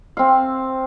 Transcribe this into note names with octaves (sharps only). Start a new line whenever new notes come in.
C4 F5